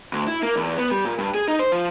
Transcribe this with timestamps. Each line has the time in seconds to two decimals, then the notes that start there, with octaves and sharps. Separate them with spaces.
0.13 D2
0.27 E4
0.43 A#3
0.56 E2
0.78 B3
0.92 G3
1.05 A#2
1.18 G2
1.35 G#4
1.48 D#4
1.59 C5
1.72 F3